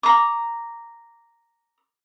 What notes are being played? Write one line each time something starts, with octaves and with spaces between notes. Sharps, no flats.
A#5 D6